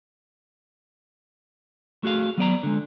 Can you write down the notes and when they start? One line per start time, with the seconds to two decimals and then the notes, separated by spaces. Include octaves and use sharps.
2.03 A3 F#4 G#4 F5
2.38 F#3 B3 D5 A#5
2.63 D3 G#3